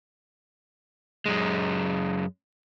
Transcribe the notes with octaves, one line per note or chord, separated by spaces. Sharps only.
F#2 G#3